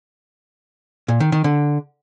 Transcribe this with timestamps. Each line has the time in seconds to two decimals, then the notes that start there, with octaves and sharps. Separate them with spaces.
1.08 A#2
1.20 D#3
1.32 D#3
1.44 D3